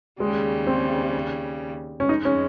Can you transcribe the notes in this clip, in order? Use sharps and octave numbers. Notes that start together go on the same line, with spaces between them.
D#2 C#3 G3 G#3
C4
C#4
F2 C#3 G#3 D#4
C#4